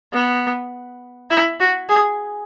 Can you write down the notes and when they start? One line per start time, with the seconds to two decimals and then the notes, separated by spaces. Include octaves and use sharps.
0.14 B3
1.30 E4
1.60 F#4
1.89 G#4